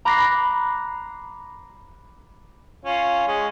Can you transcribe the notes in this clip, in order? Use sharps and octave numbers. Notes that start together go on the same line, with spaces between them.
A#5 B5 D6 F#6 A#6 C7
C#4 F4
G#3 C#4